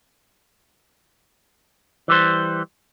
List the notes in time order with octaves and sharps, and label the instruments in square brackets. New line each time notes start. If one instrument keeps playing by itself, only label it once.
[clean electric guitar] E3 G3 C5